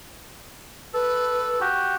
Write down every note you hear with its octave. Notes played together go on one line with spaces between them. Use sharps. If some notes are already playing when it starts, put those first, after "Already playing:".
A4 B4
F#4 G4